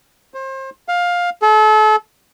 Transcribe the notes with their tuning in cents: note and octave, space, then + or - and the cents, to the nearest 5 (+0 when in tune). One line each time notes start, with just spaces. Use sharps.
C5 +30
F5 +15
A4 -35